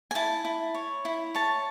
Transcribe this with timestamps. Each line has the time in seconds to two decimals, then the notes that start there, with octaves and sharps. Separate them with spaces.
0.11 G#5
0.15 E4 A5
0.45 E4
0.75 C#5
1.05 E4
1.35 C#5 A5